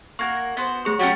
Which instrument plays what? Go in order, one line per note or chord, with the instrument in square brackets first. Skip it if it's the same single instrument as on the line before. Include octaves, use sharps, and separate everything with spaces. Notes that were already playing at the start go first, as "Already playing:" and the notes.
[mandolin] A#3 F#4 A#4 [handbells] C#6 G#6
[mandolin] B3 F#4 C5
[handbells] A3 G#4 C#6
[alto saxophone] F#3 [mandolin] C#4 G4 [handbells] C#6 A6